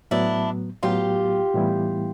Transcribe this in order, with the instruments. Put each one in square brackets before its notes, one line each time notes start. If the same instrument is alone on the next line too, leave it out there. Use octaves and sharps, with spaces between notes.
[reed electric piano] A2 F#3 B3 [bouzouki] D4 E4
[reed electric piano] A2 F#3 B3 [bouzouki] F4 G4
[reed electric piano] A2 E3 G3 B3 E4